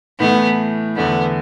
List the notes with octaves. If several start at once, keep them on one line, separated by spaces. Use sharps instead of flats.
A2 E3 A3 B3
E2 D3 A3 B3